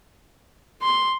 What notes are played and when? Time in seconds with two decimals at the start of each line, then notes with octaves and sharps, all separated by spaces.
0.82 C6